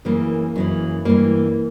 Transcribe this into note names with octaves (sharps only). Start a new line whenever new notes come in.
F#2 C#3 E3 A#3
F#2 C#3 E3
G2 E3 A#3